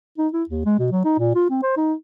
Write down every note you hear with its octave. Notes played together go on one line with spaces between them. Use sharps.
D#4
E4
D#2
G#3
B2
F#3
D#4
A#2
F4
C4
C5
D#4